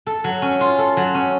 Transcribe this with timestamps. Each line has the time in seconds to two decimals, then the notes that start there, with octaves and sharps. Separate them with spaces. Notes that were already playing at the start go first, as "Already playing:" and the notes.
0.07 A4
0.24 F#3
0.42 C#4
0.61 F4
0.78 A4
0.97 F#3
1.14 C#4